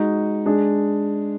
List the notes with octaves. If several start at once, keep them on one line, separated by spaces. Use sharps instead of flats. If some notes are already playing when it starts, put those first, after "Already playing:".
Already playing: G#3 D#4 F#4
G#3 D4 G#4